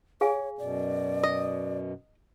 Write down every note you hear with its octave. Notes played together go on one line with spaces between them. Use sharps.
G#4 C#5 F5 G#5
F#2 B2 D5
D#5